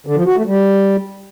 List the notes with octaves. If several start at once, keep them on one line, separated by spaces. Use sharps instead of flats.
D3
F3
F#4
A3
G3